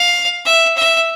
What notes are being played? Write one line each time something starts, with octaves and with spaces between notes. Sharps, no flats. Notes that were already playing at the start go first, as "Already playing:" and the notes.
Already playing: F5
E5
E5